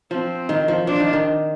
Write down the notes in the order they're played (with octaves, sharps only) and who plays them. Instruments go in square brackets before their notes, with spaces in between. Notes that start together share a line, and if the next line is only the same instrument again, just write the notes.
[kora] F3 [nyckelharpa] C4
[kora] D#3
F3
[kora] F3 [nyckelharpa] D4
[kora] D#3
D#3